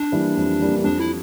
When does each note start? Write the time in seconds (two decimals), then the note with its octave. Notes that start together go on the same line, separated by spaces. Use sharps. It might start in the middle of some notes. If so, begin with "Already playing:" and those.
Already playing: D4
0.12 E3 G3 A#3
0.37 F2
0.61 E3 G3 A#3
0.84 F2 D4
1.00 E4